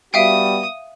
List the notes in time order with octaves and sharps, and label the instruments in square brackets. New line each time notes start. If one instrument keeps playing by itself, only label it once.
[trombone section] G3 B3 F#4 [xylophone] E5 F5 G5 [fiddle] D#6